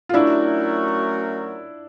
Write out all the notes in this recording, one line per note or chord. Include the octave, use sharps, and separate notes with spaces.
F4
F#3 A3 C#4 D4 E4 F#4 A#4